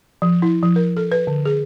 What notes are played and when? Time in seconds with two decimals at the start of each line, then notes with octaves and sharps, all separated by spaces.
0.22 F3
0.42 E4
0.63 F3
0.76 A#4
0.97 A4
1.12 B4
1.27 D3
1.45 G#4